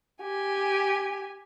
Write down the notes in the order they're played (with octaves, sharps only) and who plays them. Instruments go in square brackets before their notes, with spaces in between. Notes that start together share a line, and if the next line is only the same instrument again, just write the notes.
[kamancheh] G4 G#5